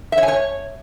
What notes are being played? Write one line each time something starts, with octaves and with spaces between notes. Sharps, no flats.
E5
C#5
G#5
C#5